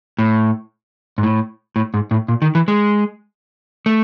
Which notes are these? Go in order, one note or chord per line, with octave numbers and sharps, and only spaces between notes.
A2
G#2
A2
A2
G#2
A2
A#2
D#3
E3
G#3
A3